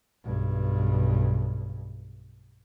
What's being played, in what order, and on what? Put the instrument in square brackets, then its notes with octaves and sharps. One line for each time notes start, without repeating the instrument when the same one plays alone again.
[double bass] B1 G2